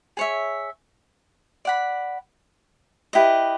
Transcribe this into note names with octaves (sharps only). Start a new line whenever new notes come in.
G#4 C#5 E5
D5 F#5 B5
E4 G4 B4 D#5